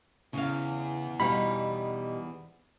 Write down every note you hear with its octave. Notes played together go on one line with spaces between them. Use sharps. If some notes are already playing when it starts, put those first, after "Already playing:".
E2 C#3 F5
B2 G3 D#4 C5 D5 F5 B5